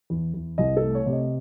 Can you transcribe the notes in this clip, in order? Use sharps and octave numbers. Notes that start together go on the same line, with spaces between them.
E2
E2
C2 D#5
A4
A3
C#5
C3
D#5